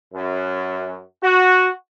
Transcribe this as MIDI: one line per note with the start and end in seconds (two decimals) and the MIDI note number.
0.14 1.02 42
1.23 1.70 66